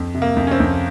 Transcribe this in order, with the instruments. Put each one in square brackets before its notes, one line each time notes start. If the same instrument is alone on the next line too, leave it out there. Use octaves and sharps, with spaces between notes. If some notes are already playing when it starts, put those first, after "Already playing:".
Already playing: [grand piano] F2
C3
A#3
F2
C#4
C4
F2